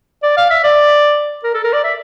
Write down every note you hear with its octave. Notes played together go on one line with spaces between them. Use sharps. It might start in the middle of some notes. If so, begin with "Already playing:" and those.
D5
F5
E5
D5
A#4
A4
A#4
D5
E5